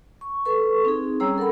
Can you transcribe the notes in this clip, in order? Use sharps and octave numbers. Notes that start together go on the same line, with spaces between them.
C#6
A4 B4 C#6
C4 D#4 G#4
G3 C#4 G#4 C#5 A#5 E6
A4 A#4 F#5 B5